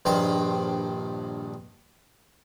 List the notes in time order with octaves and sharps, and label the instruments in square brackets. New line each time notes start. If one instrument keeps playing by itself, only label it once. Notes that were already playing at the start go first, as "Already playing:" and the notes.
[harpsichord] A#1 G2 D#3 C5 G5